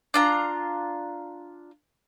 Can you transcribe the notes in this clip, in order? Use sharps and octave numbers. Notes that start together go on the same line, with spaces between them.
D4 F4 A#5